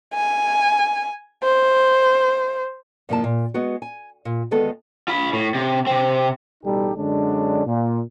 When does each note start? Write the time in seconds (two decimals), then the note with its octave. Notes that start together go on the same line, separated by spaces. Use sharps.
0.14 G#5
1.43 C5
3.09 G2 C3 F3 A#3 E4 A5
3.24 A#2
3.54 G#3 B3 F#4
3.82 G#5
4.25 A#2
4.51 D2 D#3 G#3 B3 A4
5.08 F4 B5
5.33 A2
5.54 C3
5.87 C3 C4
6.64 A1 B2 G3 D#4 G4 A4
6.97 F#2 D3 G#3 C#4 D4
7.66 A#2